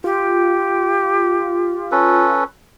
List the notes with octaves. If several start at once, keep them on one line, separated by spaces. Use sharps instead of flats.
F4 G4
C#4 A4 B4